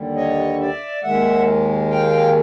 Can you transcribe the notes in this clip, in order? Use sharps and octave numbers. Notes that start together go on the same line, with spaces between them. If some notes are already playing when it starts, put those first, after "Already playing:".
Already playing: D#2 D3 G3
C#5 D#5
D5 E5
D#2 D#3 G#3 E5 F#5
F5 G5